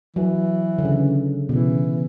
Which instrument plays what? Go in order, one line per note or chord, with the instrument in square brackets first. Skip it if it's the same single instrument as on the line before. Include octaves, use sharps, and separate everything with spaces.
[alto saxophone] E3 [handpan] F#3
[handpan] D3
C#3
B2
[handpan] C#3 [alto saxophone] E3